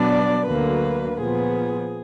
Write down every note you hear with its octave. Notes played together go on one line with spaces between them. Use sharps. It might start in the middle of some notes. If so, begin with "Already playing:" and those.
Already playing: B2 F#3 B3 D4 D5
D2 D3 F#3 A#3 B4
A#2 F3 B3 G#4